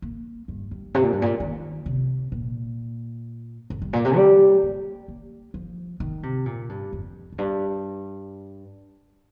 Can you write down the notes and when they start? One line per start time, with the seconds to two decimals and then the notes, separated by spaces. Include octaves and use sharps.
0.02 A#3
0.48 G2
0.71 G2
0.94 C3
1.03 A#2
1.12 G2
1.22 A#2
1.40 D#3
1.86 C3
2.32 A#2
3.70 F2
3.82 G2
3.93 A#2
4.05 C3
4.16 G3
4.63 A#3
5.08 A#3
5.54 F3
6.00 D#3
6.23 C3
6.46 A#2
6.69 G2
6.93 F2
7.32 F2
7.38 G2